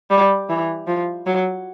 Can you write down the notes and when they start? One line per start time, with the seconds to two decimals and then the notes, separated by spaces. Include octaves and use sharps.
0.10 G3
0.49 E3
0.87 F3
1.26 F#3